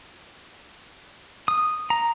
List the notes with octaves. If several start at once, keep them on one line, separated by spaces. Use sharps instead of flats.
D#6
A#5